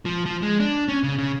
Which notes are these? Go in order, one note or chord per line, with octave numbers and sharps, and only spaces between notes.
F3
F3
G#3
D4
C#4
C#3
C#3